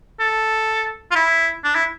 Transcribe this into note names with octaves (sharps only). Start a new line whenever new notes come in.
A4
F4
E4
D4
E4